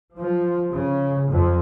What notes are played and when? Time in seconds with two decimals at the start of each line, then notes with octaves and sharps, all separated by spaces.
0.16 F3
0.73 C#3
1.29 F2